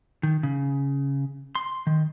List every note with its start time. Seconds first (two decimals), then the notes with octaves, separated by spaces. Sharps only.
0.23 D#3
0.43 C#3
1.55 C6
1.87 D#3